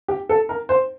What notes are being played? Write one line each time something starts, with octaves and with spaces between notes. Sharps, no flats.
G4
A4
A#4
C5